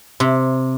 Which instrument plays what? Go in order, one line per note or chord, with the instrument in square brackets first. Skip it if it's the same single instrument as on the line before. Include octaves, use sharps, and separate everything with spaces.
[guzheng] C3